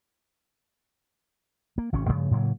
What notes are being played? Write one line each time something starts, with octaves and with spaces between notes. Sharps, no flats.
A#3
G#1 C3 C#4
G2 C#3 F3 A3
A2 C#3 F#3 A#3